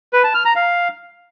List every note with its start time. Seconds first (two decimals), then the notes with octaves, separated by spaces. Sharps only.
0.13 B4
0.24 A5
0.34 F6
0.45 A#5
0.56 F5